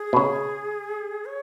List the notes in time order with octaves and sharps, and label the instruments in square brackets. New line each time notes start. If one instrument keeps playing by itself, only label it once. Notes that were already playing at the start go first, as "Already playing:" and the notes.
Already playing: [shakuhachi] G#4
[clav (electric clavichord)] B2
C#3
[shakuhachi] C#5